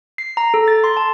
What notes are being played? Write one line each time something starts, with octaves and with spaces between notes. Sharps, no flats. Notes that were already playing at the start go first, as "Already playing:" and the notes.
C7
A#5
A4
A6
C6
A5